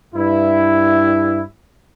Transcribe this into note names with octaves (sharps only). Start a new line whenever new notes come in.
G2 E4